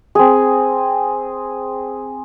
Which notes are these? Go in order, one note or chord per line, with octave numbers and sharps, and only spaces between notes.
C4 G#4